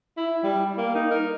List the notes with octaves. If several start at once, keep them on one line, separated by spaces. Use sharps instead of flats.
E4
G3
A#3
D#4
A#4